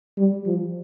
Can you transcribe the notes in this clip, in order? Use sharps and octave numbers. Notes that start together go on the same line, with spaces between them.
G3
F3